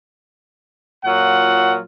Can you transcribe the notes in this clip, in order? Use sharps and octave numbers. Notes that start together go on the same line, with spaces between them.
A#2 F#3 F4 F#5